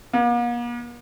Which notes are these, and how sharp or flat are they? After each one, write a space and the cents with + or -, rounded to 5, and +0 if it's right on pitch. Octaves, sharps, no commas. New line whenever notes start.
A#3 +45